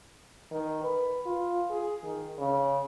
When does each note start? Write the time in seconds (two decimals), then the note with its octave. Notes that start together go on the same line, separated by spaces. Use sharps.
0.51 D#3
0.84 B4
1.25 F4
1.70 G#4
2.03 D#3
2.38 C#3